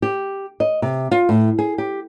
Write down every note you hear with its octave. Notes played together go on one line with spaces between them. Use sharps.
G4
D#5
C3
F4
A2
G#4
G4